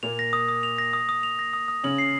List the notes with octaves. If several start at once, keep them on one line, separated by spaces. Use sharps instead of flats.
A#2 A#3 F7
A#6
D#6
D#6
F7
A#6
D#6
D#6
F7
A#6
D#6
D#6
C#3 C#4 F#7
C7